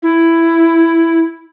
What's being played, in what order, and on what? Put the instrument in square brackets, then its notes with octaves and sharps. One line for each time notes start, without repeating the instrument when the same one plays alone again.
[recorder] E4